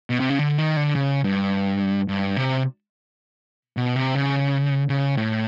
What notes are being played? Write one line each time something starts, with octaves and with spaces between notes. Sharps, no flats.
B2
C3
C#3
D3
D#3
D3
C#3
G2
G2
C3
B2
C3
C#3
C#3
A2